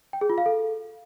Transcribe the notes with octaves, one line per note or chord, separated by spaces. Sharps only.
G5
G#4
F4
F5
A4